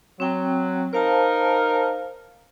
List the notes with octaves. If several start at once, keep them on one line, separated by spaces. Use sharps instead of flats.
F#3 C4 G5
D#4 A#4 C5 F5 A5